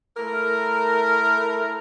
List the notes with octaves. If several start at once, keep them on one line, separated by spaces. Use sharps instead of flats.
A3 E4 A#4